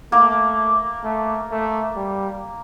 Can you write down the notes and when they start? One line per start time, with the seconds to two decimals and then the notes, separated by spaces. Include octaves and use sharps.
0.12 A3 A#3
1.03 A3
1.51 A3
1.96 G3